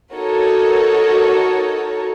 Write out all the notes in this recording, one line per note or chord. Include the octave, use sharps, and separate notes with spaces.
D#4 F#4 A4 A#4 C#5